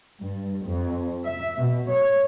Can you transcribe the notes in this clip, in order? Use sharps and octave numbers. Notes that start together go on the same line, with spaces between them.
G2
F2
E5
B2
C#5